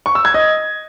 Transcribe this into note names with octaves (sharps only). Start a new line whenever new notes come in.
C#6
E6
G#6
D#5